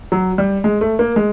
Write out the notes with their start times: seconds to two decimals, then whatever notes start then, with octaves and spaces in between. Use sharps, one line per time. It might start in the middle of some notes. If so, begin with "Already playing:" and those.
0.12 F#3
0.38 G3
0.64 G#3
0.81 A3
0.99 A#3
1.16 G#3